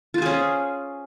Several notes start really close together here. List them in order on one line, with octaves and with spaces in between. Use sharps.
F4 C5 G#4 C#4